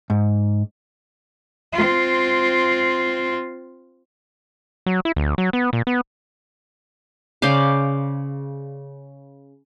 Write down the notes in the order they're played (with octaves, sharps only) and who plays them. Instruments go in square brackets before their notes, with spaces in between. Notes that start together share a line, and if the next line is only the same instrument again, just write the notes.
[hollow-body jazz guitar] G#2
[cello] C4 F4
[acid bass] F#3
E4
D2
F#3
B3
A#2
B3
[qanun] C#3 C5 D5 F5